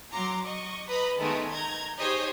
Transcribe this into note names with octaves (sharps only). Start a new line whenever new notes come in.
F#3 A#5 C6 D6
D#5 C#6
B4 D#5 A#5 B5
D#3 G#3 A3 B3 D#4
A#5 G6 G#6
D#4 G4 G#4 C5 C#5 D#5